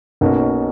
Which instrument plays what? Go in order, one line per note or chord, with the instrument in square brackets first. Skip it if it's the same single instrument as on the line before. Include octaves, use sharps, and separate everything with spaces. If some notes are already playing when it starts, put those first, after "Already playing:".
[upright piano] B1 B2 A#3 C#4 F#4